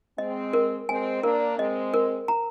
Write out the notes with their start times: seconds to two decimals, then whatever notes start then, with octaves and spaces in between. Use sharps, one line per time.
0.18 G#3 C4 D#5
0.53 A#4
0.88 G#3 C4 G#5
1.23 A#3 D4 A#4
1.58 G#3 C4 D#5
1.94 A#4
2.28 A#5